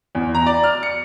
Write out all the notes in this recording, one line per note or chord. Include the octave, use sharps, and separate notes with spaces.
E2
A#5
D5
F6
C#7